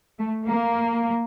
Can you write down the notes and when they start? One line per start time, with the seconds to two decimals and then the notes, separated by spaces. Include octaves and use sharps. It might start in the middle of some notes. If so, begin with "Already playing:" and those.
0.19 A3
0.47 A#3